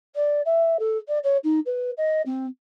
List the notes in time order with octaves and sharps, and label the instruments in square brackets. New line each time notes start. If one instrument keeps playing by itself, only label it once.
[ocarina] D5
E5
A4
D5
C#5
D#4
B4
D#5
C4